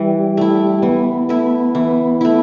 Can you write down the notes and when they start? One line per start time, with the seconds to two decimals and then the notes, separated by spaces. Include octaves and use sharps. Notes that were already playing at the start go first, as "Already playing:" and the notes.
Already playing: E3 G3 E4
0.37 A3 E4
0.82 E3 B3
1.29 A3 E4
1.75 E3
2.21 A3 E4